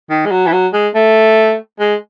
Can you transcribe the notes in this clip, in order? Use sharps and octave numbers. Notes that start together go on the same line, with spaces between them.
D#3
G#3
F#3
E3
F#3
G#3
A3
G#3